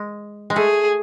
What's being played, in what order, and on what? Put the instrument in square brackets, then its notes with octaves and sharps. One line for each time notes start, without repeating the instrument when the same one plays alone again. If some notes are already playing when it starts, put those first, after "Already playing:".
Already playing: [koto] G#3
G#3
[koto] A3 [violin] G#4